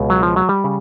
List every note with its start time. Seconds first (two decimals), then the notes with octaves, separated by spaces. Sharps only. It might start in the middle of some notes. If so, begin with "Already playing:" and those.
Already playing: C#2 B2
0.10 F#3
0.23 F3
0.36 F#3
0.49 G3
0.64 C#3